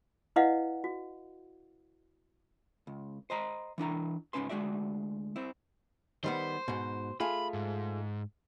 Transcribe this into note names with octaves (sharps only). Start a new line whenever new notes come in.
E4 B4 D5 D#5 F5 F#5
F#4
C#2
C5 D#5 A#5 B5
E3 D4 E4 A#5
G#2 C#3 C4 C#4 B4 C6
D2 G#3 F#4 D5 E5
C4 E4
D#3 G3 B3 C5
G#2 B2
A3 F4 G#4 B5
G#2